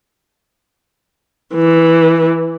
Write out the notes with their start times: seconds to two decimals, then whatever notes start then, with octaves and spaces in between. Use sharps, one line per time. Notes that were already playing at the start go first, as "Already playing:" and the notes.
1.54 E3